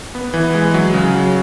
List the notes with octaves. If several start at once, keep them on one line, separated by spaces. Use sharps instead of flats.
B3
E3
G#3
F#3
C#3
F#3